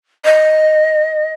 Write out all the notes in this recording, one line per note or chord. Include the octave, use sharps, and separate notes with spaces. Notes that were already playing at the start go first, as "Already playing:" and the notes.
D#5